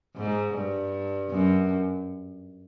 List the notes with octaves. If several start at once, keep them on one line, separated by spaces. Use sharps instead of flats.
G#2
G2
F#2